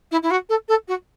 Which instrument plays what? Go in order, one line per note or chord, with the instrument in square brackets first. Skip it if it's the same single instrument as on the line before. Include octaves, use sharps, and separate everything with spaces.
[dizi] E4
E4
F#4
A4
A4
F#4